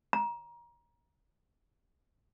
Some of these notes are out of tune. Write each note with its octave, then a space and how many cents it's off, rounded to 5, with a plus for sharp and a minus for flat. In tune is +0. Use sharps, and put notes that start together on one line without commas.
A#5 +25